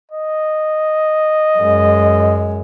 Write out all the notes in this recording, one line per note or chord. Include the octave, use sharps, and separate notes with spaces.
D#5
F#2 G#3